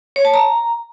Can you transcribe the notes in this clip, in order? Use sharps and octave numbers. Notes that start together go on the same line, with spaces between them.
C#5
A5
A#5